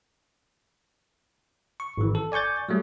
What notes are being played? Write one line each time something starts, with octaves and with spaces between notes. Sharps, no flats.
C#6
G#1 E3
A4
D5 G#5 C#6 G6 A6
F#3 G3 A3